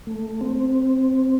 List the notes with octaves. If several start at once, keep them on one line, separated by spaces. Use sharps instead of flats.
A3
C4